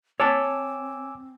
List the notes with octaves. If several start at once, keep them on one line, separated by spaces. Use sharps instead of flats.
C4 C#5 G#5 A5 D6 E6